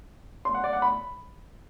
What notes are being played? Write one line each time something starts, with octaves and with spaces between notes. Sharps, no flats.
C6
F#5
D5
F#5
B5